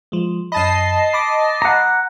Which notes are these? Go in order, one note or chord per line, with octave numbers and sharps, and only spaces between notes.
F3 G#3
F#2 D#5 A5 B5 C7
B5 D6 A#6
F#5 A#5